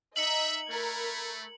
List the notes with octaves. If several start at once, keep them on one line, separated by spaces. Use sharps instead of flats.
D#4 D#5 E5 C#7 F#7
A3 A#4 B5 G#6